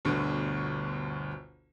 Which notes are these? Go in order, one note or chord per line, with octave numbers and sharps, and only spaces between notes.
G1 D2 B2 D3